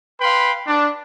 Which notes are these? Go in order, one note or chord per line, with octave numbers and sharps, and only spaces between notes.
B4 F5 G5 B5 C6
D4